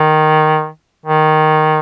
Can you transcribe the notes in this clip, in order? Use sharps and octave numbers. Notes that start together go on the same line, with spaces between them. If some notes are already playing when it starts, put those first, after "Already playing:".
Already playing: D#3
D#3